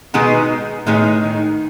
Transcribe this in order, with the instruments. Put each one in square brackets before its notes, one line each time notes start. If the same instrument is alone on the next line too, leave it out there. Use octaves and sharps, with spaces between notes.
[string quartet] B2 [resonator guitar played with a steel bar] D#3 G#3 B3 D#4 G#4
[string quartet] A2 [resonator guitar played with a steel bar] D#3 G#3 B3 D#4 G#4
[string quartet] D#3